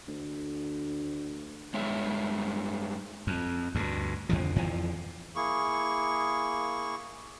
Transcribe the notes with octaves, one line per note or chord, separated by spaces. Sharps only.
D2
G2 G#3 C#5 E5
F2
D2 G2
F2 D3 F3
F2 E3 F3
A#3 E4 G#4 C#6